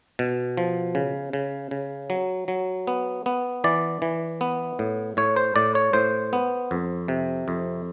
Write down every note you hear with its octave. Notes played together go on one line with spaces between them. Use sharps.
B2
F3
C#3
C#3
C#3
F#3
F#3
B3
B3
E3 D5
E3
B3
A2
A2 C#5
C5
A2 D5
C#5
A2 C5
B3
F2
C3
F2